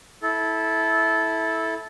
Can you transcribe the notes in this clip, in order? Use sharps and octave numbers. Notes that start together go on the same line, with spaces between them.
E4 A4